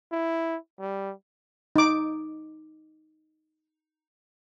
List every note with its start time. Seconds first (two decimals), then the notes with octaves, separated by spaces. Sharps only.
0.12 E4
0.80 G3
1.76 D#4 D6